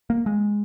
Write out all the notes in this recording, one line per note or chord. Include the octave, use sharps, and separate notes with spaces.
A#3
G#3